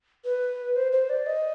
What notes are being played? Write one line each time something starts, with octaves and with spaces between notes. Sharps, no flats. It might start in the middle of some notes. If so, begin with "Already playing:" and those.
B4
C5
C5
D5
D#5